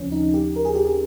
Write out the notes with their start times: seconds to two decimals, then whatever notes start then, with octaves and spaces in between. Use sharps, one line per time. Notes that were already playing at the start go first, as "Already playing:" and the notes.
Already playing: D#2 C#3 F3 C4 C#4
0.12 D#4
0.34 G4
0.56 A#4
0.65 G#4
0.75 G4
0.85 G#4